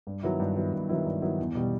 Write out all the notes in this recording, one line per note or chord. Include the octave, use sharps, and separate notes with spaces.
G2
D#3 F#3 B3 E4
G2
D#3 F#3 B3 E4
G2
D#3 F#3 B3 E4
G2
D#3 F#3 B3 E4
E2
B2 G3